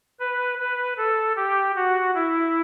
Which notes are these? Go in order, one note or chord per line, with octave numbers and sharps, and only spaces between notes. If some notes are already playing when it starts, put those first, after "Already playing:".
B4
B4
A4
G4
F#4
E4